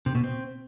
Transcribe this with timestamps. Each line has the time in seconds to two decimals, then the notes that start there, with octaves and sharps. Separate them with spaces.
0.06 C3
0.15 B2
0.24 C4